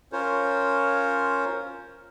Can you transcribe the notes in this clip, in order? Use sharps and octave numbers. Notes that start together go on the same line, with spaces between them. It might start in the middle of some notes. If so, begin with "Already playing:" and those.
C#4 F4 A#4 C5 C#5